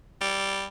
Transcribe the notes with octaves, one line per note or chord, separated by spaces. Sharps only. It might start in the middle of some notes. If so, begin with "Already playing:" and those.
G3